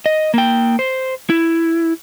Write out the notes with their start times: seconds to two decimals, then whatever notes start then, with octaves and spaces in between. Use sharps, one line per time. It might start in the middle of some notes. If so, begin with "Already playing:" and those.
0.06 D#5
0.34 A#3 G5
0.79 C5
1.30 E4